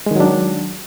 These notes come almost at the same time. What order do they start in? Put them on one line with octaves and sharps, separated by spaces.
G#3 D#3 F#3 D4